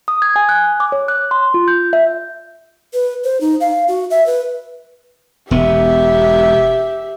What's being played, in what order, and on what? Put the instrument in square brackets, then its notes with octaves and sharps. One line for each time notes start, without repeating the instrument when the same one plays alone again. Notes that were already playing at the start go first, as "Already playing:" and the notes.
[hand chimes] D#6
G#6
G#5
F#6
D6
C#5
F#6
C6
F4
G6
E5
[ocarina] B4
C5
D#4
F5
F#4
E5
B4
[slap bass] E1 B3 [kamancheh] G4 E5